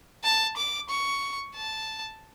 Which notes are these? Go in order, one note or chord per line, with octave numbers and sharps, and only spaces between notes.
A5
D6
C#6
A5